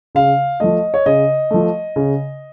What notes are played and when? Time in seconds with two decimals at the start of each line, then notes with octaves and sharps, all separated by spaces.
0.15 C#3 F5
0.60 F3 A3 D#5
0.94 C#5
1.06 C#3 D#5
1.51 F3 A3
1.96 C#3